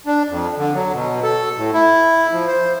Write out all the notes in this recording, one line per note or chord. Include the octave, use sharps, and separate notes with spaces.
D4
F2
D3
F#3
B2
A4
A2
E4
F3
C5